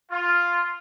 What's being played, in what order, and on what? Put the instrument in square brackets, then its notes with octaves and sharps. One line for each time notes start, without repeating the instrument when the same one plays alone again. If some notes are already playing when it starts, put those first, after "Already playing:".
[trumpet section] F4